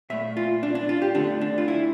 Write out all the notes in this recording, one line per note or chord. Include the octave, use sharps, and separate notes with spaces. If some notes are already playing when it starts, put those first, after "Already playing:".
A#2 A3 E5
F4
D4
D4
F4
G4
D3 A3 D4
D4
F4
E4